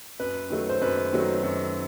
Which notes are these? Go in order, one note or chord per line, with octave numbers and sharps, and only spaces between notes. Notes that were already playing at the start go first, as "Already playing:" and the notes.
F#2 B4
D#3 F#3 A3
C5
F#2 B4
D#3 F#3 A3
F#2